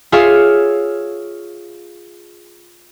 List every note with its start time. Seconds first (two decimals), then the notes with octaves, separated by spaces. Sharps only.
0.12 F4 G#4 C#5 E5 F5